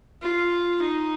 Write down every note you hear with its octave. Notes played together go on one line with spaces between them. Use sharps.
F4
D#4